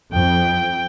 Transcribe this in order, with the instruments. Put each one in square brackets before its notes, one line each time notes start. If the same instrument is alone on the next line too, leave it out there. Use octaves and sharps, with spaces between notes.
[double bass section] F2 [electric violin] G5